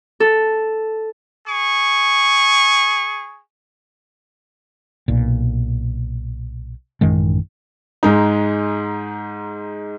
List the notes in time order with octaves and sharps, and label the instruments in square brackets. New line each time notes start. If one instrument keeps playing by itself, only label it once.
[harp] A4
[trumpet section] G#4 C#6
[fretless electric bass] B1 A#2
A1 F#2 D#3 G#3
[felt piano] G#2 G#3 D#4